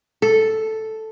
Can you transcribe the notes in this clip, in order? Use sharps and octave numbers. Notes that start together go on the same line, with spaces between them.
A4